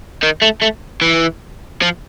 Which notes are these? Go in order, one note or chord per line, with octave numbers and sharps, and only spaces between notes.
D#3
A3
A3
E3
F3